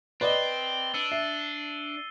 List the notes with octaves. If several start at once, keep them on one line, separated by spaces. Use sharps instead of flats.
C4 B4 D5 D#5 A6 G7
D4 E6 C#7 D#7
E5 C7